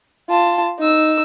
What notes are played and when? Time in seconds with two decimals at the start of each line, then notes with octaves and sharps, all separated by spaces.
0.29 F4 A5
0.79 D#4 E6